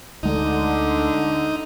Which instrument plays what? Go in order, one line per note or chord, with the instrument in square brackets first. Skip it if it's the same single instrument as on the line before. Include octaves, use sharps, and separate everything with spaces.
[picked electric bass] D2 G#3 [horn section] D3 [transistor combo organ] D#4